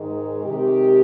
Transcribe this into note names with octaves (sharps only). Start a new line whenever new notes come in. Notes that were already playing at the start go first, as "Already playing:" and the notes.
Already playing: G#2 D#3 G#3
C3 D#3 G#3 G4